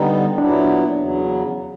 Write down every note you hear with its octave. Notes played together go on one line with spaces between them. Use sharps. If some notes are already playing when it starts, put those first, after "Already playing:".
Already playing: D3 G3 B3 D#4
A#2 F#3 B3 D4 E4
E2 C#3 F#3